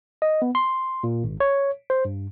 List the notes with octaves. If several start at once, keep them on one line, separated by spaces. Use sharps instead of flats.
D#5
B3
C6
A#2
G#1
C#5
C5
G2